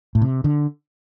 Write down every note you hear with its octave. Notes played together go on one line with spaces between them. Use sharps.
A2
C3
D3